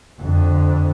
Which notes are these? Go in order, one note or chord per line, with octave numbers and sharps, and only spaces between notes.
F2 D3